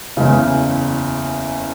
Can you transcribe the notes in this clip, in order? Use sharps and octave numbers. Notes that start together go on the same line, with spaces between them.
F#1 E2 C#3